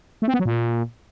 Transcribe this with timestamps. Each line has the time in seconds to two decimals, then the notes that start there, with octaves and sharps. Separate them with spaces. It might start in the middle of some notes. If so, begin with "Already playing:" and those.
0.22 A3
0.28 C4
0.34 B3
0.40 F#3
0.45 A#2